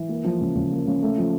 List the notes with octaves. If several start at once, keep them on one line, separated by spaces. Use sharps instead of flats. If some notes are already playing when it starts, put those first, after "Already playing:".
Already playing: E3
A#3
F3
C#3
C#3
A#3
C#3
A3
F3